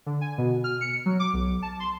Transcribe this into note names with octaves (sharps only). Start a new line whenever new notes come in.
D3
G#5
B2
F6
C#7
F#3
D6
B1
A5
C6